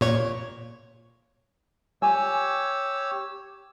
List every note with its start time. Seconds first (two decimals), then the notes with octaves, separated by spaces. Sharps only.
0.01 A#2 C#5
2.02 G4 C#5 G#5 E6